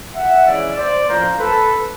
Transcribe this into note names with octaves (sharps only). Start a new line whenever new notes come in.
E5 F#5
E3 G#3 C#4 E4 D5 E5
C5 D5
A2 F3 A#3 C#4 A#4 C5
A4 B4